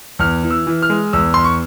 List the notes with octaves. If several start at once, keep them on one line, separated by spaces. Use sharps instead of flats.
E2 F6
E3
E6
E3
F6
G#3
E2 E6
E2 C6
C#6